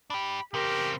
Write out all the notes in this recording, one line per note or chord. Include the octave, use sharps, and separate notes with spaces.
D4 G4 B5
C#3 C4 G4 A#4